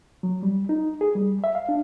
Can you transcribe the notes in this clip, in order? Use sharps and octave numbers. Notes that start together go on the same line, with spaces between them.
F#3
G3
D#4
G#4
G3
E5
F5
D4